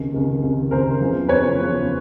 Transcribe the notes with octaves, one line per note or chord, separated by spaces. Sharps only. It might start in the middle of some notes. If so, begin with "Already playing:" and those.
Already playing: C#2 C3 D#3
C#2 C3 D#3
C#2 C3 D#3
C#2 C3 D#3 A#4 C5
E2 C#3 F3
E2 C#3 F3 B4 C#5
E2 C#3 F3